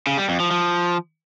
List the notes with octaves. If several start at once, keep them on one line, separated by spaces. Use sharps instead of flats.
C#3
G3
F2
F3
F3